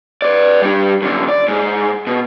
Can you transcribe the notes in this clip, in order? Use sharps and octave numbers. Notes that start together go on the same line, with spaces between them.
B4 D5
G3 D4
F#2 D3
D5
G#2
B2